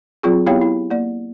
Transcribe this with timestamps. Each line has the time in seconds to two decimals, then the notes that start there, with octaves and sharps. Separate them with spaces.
0.23 F#3 C4 F4 G#4
0.46 B3 E4 G4 C#5 F5 G5
0.61 E4
0.90 A#3 D5